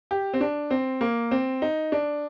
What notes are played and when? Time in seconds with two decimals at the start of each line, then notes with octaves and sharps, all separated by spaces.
0.11 G4
0.34 C4
0.41 D4
0.71 C4
1.01 A#3
1.31 C4
1.62 D#4
1.92 D4